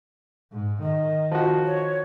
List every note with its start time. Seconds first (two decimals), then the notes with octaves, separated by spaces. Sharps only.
0.52 G#2
0.83 D#3 D#5
1.31 F3 F#4
1.66 C#5